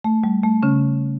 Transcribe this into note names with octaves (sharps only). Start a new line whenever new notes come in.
A3
G3
A3
C#3 C#4